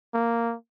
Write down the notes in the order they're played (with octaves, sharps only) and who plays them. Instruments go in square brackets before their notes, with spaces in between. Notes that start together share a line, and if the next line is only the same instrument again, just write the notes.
[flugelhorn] A#3